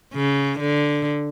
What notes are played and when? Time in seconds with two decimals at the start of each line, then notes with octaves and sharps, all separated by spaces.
0.14 C#3
0.59 D3